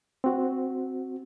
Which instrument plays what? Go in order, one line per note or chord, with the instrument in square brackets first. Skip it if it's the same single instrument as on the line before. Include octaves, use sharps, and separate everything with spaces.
[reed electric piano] C4 F#4